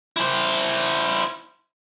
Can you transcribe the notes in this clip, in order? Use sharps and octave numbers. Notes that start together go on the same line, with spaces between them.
E4 C5